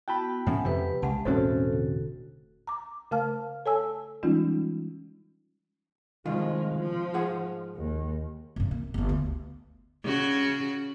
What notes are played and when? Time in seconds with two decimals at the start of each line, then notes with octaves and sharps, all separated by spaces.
0.08 B3 E4 F#4 G5 A5 B5
0.46 A2 F3 C#4 E5 F#5 G#5
0.65 F2 C3 G4 B4
1.02 C2 C#3 G#3 F#5 A5
1.25 E1 A2 C4 C#4 F#4 A4 C5
1.73 D3
2.67 A#5 D6
3.11 C#3 A3 A#4 F5 A5 F6
3.66 A4 C#5 G#5 A5 E6
4.23 E3 G3 G#3 C#4 D#4 F4
6.26 C2 D#3 F3 G#3 F4
6.78 F3
7.14 G#2 G#4 F#5
7.76 D#2
8.56 C2 G2
8.71 A#2
8.94 G1 G2
9.09 D2
10.04 C#3 F#4